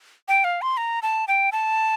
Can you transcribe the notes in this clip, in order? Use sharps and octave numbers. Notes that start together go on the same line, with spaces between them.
G5
F5
C6
A#5
A5
G5
A5